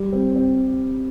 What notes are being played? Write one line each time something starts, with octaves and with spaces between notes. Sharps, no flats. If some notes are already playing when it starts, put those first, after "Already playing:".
Already playing: G3
C4
C4